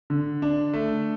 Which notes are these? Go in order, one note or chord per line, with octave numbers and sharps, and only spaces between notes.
D3
D4
A3